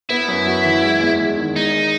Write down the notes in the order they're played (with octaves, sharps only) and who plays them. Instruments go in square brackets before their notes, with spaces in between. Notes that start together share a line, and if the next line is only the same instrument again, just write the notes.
[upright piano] B3 [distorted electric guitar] E4
[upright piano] F#2
F#4
E3
G#3
E2
E2
D#3
[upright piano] G#3 [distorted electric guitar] D#4